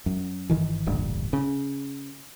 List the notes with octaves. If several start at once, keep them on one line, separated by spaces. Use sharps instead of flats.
F#2
G1 D#3 E3
D#1 A1 D2 G2
C#3